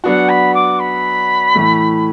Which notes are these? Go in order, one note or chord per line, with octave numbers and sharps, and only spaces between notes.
F#3 B3 D4 F#4 F#5
B5
D6
B5
A2 E3 A3